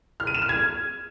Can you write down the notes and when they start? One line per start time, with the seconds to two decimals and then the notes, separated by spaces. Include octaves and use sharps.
0.20 F6
0.27 D#7
0.35 E7
0.42 F6
0.49 G#6